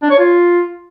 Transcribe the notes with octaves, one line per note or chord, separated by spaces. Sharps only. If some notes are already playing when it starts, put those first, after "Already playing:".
D4
C#5
F4